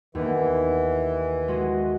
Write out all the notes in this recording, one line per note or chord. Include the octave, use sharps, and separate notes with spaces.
D#2 E3 B3
G#3 F#4 D#5